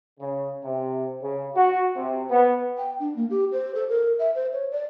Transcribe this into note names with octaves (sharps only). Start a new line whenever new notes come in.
C#3
C3
C#3
F#4
C3
B3
G5
D4
A#3
G4
C5
A4
A#4
E5
C5
C#5
D5